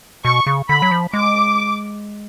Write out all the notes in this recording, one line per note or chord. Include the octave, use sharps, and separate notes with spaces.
B2 C#6
C#3
D3 B5
F#3
F3
G#3 D6